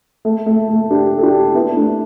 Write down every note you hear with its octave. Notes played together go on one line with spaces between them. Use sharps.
A3
A3
A3
D4 G4
A4
D4 G4
B3 E4
A3 D4